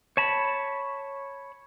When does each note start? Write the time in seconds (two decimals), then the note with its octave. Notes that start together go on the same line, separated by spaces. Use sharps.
0.17 C#5 A5 B5